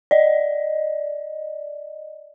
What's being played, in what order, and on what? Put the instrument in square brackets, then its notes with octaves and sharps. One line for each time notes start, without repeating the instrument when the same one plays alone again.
[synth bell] D5 D#5